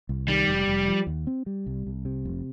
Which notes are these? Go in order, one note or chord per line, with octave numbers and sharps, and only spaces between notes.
C2
D#3 G3
F1
F1
F3
D#2
C4
G3
C2
C2
C3
F1